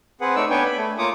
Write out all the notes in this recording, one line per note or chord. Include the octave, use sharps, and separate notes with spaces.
C4 G#4 B4 F#5
A3 D#4 C#5 D5 E6
B3 D4 B4 C#5 G5 G#5
B5
A3
A#3 F4 C#5 D6 D#6